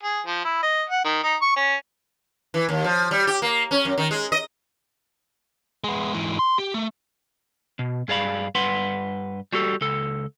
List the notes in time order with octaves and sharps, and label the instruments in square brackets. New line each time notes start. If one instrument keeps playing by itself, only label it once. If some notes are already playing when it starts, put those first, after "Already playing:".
[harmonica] G#4
F3
E4
D#5
F#5
D#3
D#4
C#6
C#4
[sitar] E3
D#2
F3
G3
G4
A#3
C#4
F#2
D#3
G#3
D#5
[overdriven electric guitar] G#3 B3
G#2 E3
C6
G4
A3
[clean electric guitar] B2
G2 G#4 D5 F5 B5
G2 B4 F#5 C6
G3 F#4 G4 A4
C#2 A4